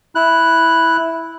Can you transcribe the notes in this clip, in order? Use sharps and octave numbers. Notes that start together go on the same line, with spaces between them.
E4 F#6